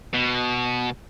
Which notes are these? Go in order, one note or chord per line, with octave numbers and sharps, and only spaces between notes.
B2